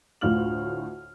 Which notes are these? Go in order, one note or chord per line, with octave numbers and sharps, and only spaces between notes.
D2 A2 F4 F6 F#7